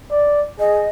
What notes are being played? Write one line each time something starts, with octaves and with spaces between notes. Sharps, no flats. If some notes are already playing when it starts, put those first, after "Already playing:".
D5
G#4 D#5